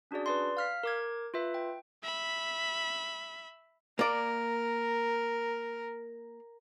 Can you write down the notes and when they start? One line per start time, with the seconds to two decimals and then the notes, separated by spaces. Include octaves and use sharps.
0.11 C#4 D4 F#4 G#4 D5
0.26 B4 D5 C6
0.57 F5 F6 B6
0.83 A#4 D6 G#6
1.34 F4 B4 E5
1.54 G5
2.03 E5 B5
3.99 A#3 A#4 D5